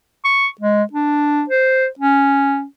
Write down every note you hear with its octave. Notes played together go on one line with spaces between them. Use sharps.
C#6
G#3
D4
C5
C#4